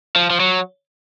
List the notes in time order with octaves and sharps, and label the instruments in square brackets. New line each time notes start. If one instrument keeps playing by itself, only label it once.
[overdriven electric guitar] F3
F3
F#3